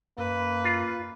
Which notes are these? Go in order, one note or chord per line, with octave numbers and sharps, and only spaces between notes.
F#2 A#3 B4
F4